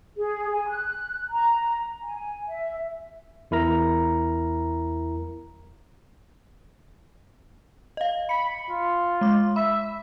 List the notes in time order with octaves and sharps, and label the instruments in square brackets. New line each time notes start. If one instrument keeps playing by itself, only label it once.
[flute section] G#4
G#5
F#6
A#5
G#5
E5
[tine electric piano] E2 E4 A#4 A#5
[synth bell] D#5 F5
[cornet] B5 [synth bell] C#7
[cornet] F4
[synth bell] G#3 D6
[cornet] E5 [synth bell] B5